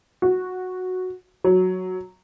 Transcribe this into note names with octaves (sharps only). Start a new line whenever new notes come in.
F#4
F#3